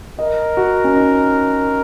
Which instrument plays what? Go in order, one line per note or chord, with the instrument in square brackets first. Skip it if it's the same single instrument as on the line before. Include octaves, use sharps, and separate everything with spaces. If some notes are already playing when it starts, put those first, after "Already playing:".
[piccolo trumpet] A#4 [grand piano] D#5
[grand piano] F#4
C#4
D#4